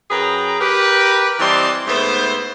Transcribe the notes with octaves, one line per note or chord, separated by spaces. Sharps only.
F#2 G#4 B4 G5 A#5
G4 A#4 B4
E3 G3 C4 D#5 A5 C6
G#2 A3 B3 E4 C5